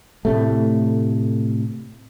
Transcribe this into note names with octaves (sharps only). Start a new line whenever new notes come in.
A2 C3 A3